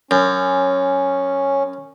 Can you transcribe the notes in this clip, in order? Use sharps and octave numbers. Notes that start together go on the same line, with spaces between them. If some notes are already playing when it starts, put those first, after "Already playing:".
F#2 C#4